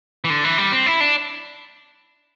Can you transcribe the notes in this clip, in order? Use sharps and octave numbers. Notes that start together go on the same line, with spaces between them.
E3
D3
E3
G3
C4
E4
D4